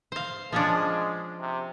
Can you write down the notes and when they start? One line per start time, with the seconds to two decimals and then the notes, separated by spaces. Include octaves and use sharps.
0.12 C5 F5
0.52 F3 G#3 C#4 D4
1.40 C3